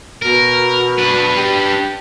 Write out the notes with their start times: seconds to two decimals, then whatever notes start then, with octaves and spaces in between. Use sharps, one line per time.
0.22 B2 A#4
0.99 D4 B4
1.36 G4